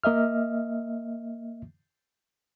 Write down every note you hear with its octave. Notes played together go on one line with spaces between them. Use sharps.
A#3 D#5 E5 F6